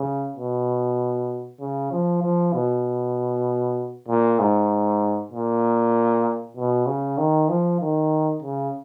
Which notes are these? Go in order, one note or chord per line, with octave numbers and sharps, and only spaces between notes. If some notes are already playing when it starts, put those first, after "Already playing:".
Already playing: C#3
B2
C#3
F3
F3
B2
A#2
G#2
A#2
B2
C#3
D#3
F3
D#3
C#3